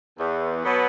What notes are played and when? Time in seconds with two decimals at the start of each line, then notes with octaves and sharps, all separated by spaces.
0.19 E2
0.64 B2 F#3 B3